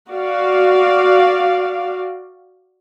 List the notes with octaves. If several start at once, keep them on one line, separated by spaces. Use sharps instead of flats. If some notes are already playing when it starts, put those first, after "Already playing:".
F#4 D5 F5